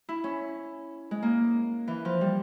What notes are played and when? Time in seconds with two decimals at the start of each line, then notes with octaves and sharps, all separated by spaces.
0.09 E4
0.24 C#4
1.11 G#3
1.22 A#3
1.88 E3
2.05 F3
2.21 G3